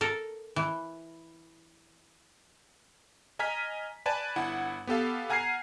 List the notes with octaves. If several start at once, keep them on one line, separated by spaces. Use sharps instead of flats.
A4 A#4
E3
D#5 G#5 A#5 F6 B6
B4 D5 G#5 A5
G1 E4 F#5
B3 G4 A4 F5
F#5 G#5 A#5 F6 G#6 C7